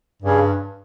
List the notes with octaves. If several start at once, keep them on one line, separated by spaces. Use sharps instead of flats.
G2 C#3 G3 C#4 G#4